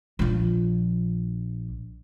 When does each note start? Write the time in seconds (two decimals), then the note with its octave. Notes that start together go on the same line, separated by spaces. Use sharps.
0.19 A#1 F3